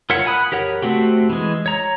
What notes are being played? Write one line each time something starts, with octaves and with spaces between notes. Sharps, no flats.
F4 A#4 C#5 E5 F#5
F#5 G#5 B5 D#6 F#6
G4 A#4 C#5 F#5
A3 C4 F#4 G4
E3 G#3
C#5 A#5